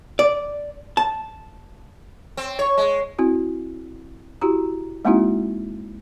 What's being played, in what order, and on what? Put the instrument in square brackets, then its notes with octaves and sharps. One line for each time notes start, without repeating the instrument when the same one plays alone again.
[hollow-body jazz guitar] D5
A5
[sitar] C4
C#5
G#3
[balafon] C4 E4 F#4
E4 F#4 G4 A#5
G#3 A#3 C4 D#4 E4 F#4